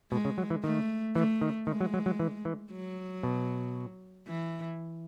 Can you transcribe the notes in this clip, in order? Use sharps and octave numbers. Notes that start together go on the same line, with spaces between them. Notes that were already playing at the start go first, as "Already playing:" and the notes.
B2 G#3
C#3
F#3
E3
D#3 A3
E3 A3
D#3
D#3 G#3
F#3
F#3
F#3
E3
E3
F#3
B2
E3